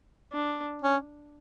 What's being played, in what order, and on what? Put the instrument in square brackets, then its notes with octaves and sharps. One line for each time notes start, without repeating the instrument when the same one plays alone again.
[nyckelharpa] D4
[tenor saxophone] C#4